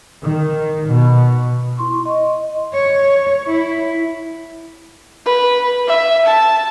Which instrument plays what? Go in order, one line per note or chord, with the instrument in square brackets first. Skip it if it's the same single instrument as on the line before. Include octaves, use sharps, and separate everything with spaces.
[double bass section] D#3
B2
[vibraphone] E4 C6 C#6
D#5
[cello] C#5
E4
[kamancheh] B4
E5
A5